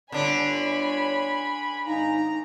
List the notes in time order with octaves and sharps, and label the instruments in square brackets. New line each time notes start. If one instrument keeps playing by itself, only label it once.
[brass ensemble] G1 C#5 [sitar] D3 D4 [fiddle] G#5 B5
[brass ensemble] G#1 F5 G#5 [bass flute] D#4 [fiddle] A#5